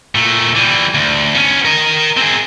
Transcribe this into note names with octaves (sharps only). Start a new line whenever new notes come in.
A#2 A3
E3 G3
D2
B3 C#4
A#4 D#5
C4 G#4